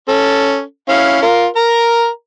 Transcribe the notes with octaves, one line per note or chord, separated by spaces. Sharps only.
C#4 A4
C#4 E4 F5
F4 A#4
A#4 A#5